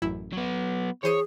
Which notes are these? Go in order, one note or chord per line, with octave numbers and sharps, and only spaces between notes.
A1 F#2 E4
F#3 B3
E3 G#4 C5 C#5 D#7